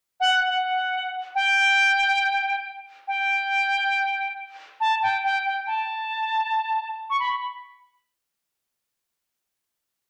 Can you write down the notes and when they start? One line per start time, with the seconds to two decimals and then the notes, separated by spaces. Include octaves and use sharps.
0.20 F#5
0.49 F#5
1.35 G5
3.08 G5
4.80 A5
5.02 G5
5.24 G5
5.45 G5
5.67 A5
7.10 C#6
7.20 B5